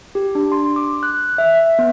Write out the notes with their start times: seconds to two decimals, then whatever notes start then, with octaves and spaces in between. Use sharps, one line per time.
0.15 G4
0.35 D4
0.52 C6
0.76 D6
1.03 F#6
1.38 E5
1.61 E5
1.79 B3